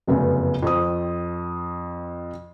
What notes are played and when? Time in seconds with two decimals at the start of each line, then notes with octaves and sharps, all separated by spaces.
0.07 F1 F#2 C#3 B3
0.63 F2 C4 D#6